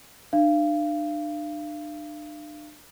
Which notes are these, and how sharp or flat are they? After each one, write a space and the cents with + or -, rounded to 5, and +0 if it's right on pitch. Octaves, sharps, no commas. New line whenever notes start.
D4 +40 F5 -30